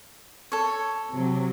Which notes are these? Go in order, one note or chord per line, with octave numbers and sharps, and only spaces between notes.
A4 C#5
C3 F#3